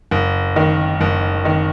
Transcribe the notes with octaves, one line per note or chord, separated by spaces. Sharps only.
F#1
D#3
F#1
D#3